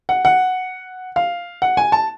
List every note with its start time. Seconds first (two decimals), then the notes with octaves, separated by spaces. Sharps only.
0.09 F#5
0.25 F#5
1.16 F5
1.62 F#5
1.77 G#5
1.92 A5